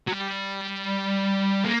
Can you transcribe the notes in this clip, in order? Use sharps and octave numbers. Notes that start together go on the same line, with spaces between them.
F#3
G3
A#3